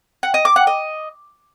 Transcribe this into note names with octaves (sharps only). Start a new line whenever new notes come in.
F#5
D#5
D6
F#5
D#5